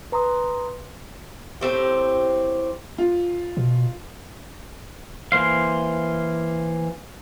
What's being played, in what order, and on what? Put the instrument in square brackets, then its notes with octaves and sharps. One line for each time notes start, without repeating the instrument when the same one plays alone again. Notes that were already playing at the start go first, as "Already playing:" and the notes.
[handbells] B4 A#5 C6 D#6
[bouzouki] A2 C4 G4
[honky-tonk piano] F4
[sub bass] B2
[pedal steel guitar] E3 A#3 C5 F5